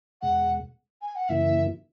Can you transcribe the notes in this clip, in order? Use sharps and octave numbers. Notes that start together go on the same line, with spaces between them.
E2 B2 G#3 F#5
G#5
F#5
F#2 C#3 E3 A#3 E4 E5